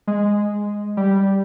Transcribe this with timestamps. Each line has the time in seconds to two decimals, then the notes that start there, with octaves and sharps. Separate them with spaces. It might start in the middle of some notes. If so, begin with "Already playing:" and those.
0.07 G#3
0.97 G3